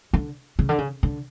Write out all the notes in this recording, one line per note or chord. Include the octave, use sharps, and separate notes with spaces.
D3
C#3
D3
C#3
D3